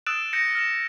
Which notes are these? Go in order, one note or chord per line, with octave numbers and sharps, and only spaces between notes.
D#6 E6 F#6 A6 D7 E7
G6 A#6 C#7 D#7
F6 A#6 E7